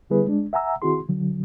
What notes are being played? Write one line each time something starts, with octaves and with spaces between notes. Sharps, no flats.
D3 G3 B3 E4 G#4 B4
G#3 D4
E5 F#5 G#5 A#5 E6
D#3 C4 E4 F#4 G#4 C6
D3 F#3